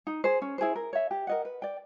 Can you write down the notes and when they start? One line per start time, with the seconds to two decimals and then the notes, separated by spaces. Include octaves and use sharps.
0.07 D#4
0.24 G#4 C5
0.42 C#4
0.58 E4 G#4 C5
0.76 A#4
0.93 C#5 E5
1.11 G4
1.27 A#4 D#5 F#5
1.45 B4
1.62 D5 G5